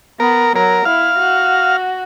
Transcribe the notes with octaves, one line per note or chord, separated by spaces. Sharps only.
B3 A#4
F#3 A#4
E4 F5
F#4